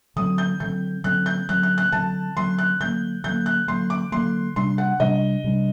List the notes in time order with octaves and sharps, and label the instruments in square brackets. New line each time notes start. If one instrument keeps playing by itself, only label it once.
[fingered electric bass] D3 F#3 C4 [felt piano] D#6
[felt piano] G6
[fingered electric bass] D3 F#3 C4 [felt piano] G6
[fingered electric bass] D3 F#3 C4 [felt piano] F#6
[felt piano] G6
[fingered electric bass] D3 F#3 C4 [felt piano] F#6
[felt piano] F#6
F#6
[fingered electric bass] D3 F#3 C4 [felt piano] A5
[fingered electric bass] D3 F#3 C4 [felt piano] C6
[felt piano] F#6
[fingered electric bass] D3 F#3 A#3 [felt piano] G6
[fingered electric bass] D3 F#3 A#3 [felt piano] G6
[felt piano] F#6
[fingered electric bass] D3 F#3 A#3 [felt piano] C6
[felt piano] D6
[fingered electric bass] D3 F#3 A#3 [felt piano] C6
[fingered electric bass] C3 G3 D4 [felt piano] C6
[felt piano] F#5
[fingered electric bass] C3 G3 D4 [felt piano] D#5
[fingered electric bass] C3 G3 D4